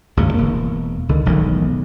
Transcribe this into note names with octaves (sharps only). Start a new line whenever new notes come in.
G#1 D2 G2 C#3
E1 A#3
C#2 D3 D#3
E1 B1 A2 D#3